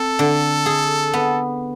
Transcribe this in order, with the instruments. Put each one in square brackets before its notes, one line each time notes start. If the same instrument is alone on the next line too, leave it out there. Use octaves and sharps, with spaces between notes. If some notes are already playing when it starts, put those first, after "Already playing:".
Already playing: [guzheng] C4 [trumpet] A4
[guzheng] D3
G#4
B3